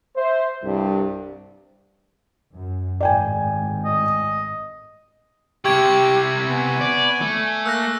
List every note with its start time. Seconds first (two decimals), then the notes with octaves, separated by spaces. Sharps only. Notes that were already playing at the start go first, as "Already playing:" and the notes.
0.17 C5 E5
0.63 C2 G2
2.56 F#2
3.00 G#1 A2 D5 G5 G#5
3.85 D#5
5.65 C3 E4 G4 C#6 G#6 D7
6.49 B3 G#5
6.81 D5
7.22 A3
7.66 A#3 E6 F#6 A#6